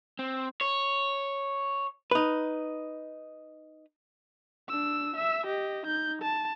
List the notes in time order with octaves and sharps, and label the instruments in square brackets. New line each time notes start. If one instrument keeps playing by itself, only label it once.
[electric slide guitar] C4
[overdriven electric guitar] C#5
[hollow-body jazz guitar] D#4 B4
[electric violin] D4 E6
E5 E6
G4 D#5
D#4 G6
A5